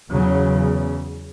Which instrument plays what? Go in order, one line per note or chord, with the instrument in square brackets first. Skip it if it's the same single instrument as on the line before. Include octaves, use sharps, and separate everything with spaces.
[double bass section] E2 C#3 F#3